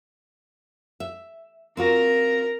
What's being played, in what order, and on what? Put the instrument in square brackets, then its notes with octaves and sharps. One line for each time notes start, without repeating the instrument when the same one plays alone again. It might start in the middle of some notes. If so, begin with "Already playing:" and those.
[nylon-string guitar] E5
[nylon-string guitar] C4 F4 F#4 [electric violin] A#4 A#5